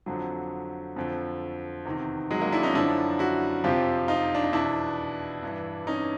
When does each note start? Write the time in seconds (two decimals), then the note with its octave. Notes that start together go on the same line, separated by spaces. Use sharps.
0.06 F2 D3 F3 F#3
0.96 F2 D3 F3
1.85 E2 C3 D#3
2.31 F#3 G#3
2.41 G#3 A#3
2.52 D4 E4
2.63 C#4 D#4
2.74 F#2 D3 F3 D4 E4
3.19 E4 F#4
3.64 F2 C3 F3 F4 G4
4.08 D#4 F4
4.35 D4
4.44 D#4
4.53 E2 B2 D4 E4
5.43 G2 E3
5.87 C#4 D#4